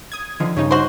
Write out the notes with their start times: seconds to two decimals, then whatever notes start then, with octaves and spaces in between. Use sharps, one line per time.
0.12 D#6 G#6
0.40 D3 D#3 F3
0.57 G2 C#3 D#4 C#5
0.71 F#4 C5